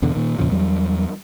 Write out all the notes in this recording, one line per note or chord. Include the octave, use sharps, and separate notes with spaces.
E2 B2 D3
A#2 D#3
E2 A#2 C#3 F3
E2 F#3 G3